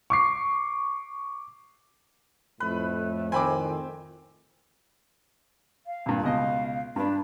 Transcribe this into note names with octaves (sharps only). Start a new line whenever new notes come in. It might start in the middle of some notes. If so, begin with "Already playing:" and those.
C#6 D6 C7
F2 A2 A3 B4
D#3 C4 G#5 B5 D6
F5
G2 A#2
C#2 B2 D#5 F5
G2 D4 B4